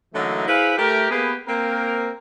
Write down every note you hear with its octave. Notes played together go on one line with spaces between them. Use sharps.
D3 E3 F#3 A3 A#3 D#4
E4 G#4 B4 C5 F5
A3 G4 A#4
A#3 B3 G4 G#4 B4
A#3 C4 A#4